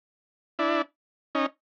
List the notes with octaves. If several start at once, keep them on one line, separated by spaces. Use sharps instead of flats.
D4 E4
C#4 D#4